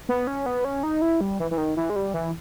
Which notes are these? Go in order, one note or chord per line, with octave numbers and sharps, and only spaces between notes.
B3
C#4
B3
C#4
D#4
E4
G3
E3
E3
D#3
E3
G#3
G3
E3